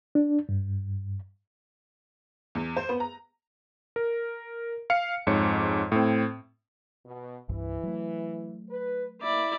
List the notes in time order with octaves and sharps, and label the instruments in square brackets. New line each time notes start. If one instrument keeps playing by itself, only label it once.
[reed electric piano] D4
G2
[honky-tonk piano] E2
C5
B3
A#5
[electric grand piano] A#4
F5 C#7
F2 G#2 C#5 C#7
A2 C4
[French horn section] B2
[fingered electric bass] C2 G2 [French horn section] E3
[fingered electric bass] F#3 A3
[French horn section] B4
[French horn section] A#3 [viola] E4 D5